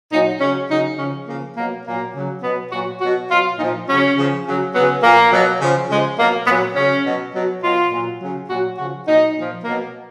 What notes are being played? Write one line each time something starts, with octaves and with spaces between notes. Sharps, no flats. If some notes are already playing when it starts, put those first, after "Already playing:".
A#2 F#3 D#4
C#3 F#3 C#4
C#3 F#3 D#4
C#3 F3 C#4
C#3 F3 A#3
B2 F#3 A#3
A#2 F#3 A#3
C#3 F#3
B2 F#3 B3
A#2 F#3 F#4
B2 F#3 F#4
B2 F#3 F4
A#2 F3 D#4
C#3 F#3 C#4
C#3 F3
C#3 F#3
C#3 F#3 B3
A#2 F3 A#3
B2 F#3
C#3 F3
C#3 F3 G#3
B2 F#3 A#3
A#2 F#3 B3
C#3 F#3 C#4
B2 F#3
B2 F#3
B2 F#3 F4
A#2 F#3
C#3 F#3
A#2 F#3 F#4
C#3 F3 F#4
A#2 F#3 D#4
A#2 F3
B2 F#3 A#3